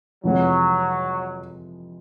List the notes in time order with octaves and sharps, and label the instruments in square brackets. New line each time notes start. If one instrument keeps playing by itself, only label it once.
[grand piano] F2 C3 E3 G#3 [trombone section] F#3